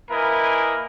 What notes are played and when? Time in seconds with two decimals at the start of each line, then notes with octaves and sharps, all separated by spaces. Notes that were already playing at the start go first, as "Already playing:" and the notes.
0.10 A#3 E4 A#4 B4 D#5 G#5